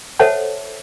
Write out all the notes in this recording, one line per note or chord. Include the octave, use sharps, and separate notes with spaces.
A4 C5 C#5 E5 F#5 A5